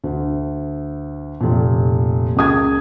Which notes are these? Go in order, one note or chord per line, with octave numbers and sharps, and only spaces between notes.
D2
F1 A#2
C#2 A#3 D#6 G#6